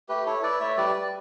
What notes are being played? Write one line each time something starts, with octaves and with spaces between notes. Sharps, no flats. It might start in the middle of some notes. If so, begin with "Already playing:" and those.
A3 G4 B4
E4 A4 C#5
E4 B4 D5
A3 C#5 E5
G3 B4 D5
G3